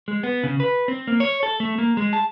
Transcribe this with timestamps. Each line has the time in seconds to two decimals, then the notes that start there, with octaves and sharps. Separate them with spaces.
0.08 G#3
0.23 B3
0.43 C#3
0.60 B4
0.88 C4
1.07 A#3
1.20 C#5
1.43 A4
1.60 A3
1.78 A#3
1.97 G#3
2.13 A5